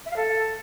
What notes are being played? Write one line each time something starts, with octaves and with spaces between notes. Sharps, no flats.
E5
F5
A4